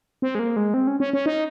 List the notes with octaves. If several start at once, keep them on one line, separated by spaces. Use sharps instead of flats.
C4
G#3
A#3
G#3
C4
C#4
C#4
C#4
D#4